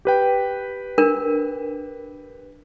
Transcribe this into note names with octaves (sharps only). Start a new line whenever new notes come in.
G4 B4 G5
D4 A#4